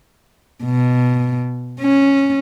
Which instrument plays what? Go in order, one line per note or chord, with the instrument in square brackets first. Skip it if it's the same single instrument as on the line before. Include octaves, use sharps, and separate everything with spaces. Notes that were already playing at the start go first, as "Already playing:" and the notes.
[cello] B2
C#4